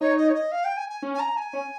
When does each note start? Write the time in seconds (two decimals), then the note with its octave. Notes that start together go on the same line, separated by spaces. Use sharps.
0.01 D#4 C#5
0.17 D#5
0.29 C#5
0.34 D#5
0.51 F5
0.64 G5
0.77 G#5
0.90 G#5
1.02 C#4
1.14 G#5
1.19 A#5
1.36 G#5
1.53 C#4